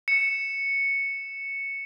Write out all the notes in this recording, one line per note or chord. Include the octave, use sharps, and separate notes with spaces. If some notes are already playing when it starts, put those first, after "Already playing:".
C#7 E7